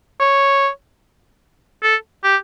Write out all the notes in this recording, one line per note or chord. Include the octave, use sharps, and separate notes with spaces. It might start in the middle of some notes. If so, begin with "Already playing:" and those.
C#5
A4
G4